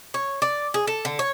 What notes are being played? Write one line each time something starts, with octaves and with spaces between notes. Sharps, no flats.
C#5
D5
G#4
A4
D3
C#5